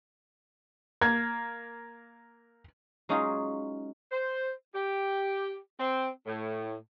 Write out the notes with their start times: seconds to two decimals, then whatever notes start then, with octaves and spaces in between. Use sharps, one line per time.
1.01 A#3 G#6
3.09 F#3 G#3 C#4 D#4 F4 G#4
4.11 C5
4.75 G4
5.80 C4
6.27 A2